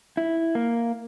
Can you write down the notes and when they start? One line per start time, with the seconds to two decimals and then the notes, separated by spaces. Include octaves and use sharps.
0.17 E4
0.55 A#3